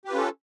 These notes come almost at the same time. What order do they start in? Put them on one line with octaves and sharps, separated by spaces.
G4 B4 F4 C#4 A4